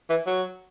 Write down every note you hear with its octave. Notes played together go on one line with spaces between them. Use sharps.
E3
F#3